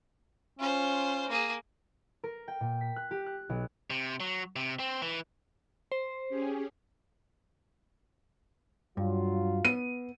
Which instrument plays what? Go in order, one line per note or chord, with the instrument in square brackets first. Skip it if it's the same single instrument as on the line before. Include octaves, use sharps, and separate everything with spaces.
[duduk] C#4 [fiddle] F4 C5
[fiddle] A#3 G#4
[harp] A#4
G5
A#2
B6
F#6
G4
F#6
B1
[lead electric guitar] C3
F#3
C3
C4
E3
[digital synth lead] C5
[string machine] C#4 G4 G#4
[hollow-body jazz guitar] G2 [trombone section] F#3 F4
[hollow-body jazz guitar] B3 [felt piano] D#7